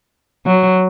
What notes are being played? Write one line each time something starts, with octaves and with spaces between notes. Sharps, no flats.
F#3